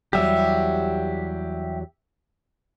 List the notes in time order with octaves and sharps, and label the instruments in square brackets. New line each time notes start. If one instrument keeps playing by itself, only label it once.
[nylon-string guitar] E2 F#3 G3 [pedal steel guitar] G4 E5